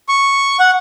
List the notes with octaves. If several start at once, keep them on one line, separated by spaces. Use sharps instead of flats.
C#6
F#5